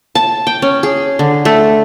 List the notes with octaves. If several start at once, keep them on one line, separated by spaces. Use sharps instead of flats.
A5
G5
C#4
G#4
D3
A3